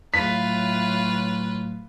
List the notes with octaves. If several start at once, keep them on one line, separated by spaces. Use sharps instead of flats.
A2 F#3 A3 F4 B4 B6